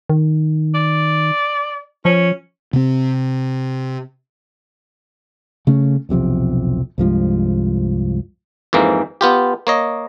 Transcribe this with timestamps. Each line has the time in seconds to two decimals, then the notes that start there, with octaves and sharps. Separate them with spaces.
0.10 D#3
0.75 D5
2.05 F3 C#4
2.73 C3 C4
5.67 C#3 A3 C#4
6.09 E1 B1 C3 F3
6.98 C2 G2 F3 G#3
8.73 F2 G#2 E3 A#3
9.21 B3 F4 G4
9.67 A#3 C#5 D#5